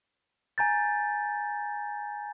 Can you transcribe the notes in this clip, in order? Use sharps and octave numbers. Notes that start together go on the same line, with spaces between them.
G#5 A#5 G6 A6